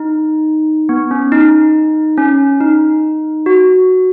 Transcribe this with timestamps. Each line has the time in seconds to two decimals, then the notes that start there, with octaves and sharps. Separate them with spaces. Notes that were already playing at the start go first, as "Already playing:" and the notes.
Already playing: D#4
0.89 B3
1.11 C#4
1.32 D#4
2.17 C#4
2.61 D#4
3.46 F#4